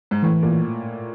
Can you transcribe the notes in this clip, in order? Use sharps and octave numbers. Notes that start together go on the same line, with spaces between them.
G#2
A2 E3
A#2